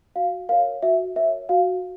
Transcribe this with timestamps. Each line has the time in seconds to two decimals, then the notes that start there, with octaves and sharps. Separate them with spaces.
0.16 F#4 F5
0.49 A#4 C#5 F5
0.83 F#4 E5
1.16 A#4 C#5 E5
1.49 F#4 F5